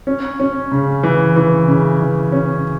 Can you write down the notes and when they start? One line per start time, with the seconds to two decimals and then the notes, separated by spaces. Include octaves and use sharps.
0.07 C#4
0.40 C#4
0.72 C#3
1.03 E3
1.36 E3
1.68 C#3
2.01 E3
2.32 C#4